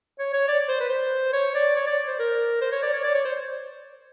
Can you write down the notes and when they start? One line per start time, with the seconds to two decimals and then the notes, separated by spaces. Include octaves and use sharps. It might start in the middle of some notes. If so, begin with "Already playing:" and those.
0.19 C#5
0.33 C#5
0.48 D5
0.68 C5
0.80 B4
0.90 C5
1.33 C#5
1.55 D5
1.76 C#5
1.87 D5
2.08 C5
2.19 A#4
2.61 C5
2.72 C#5
2.83 D5
2.93 C#5
3.04 D5
3.15 C#5
3.25 C5